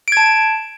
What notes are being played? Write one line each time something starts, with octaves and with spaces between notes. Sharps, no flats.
A5 G#6 D7